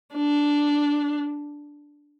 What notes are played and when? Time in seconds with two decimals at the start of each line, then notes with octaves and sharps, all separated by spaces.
0.15 D4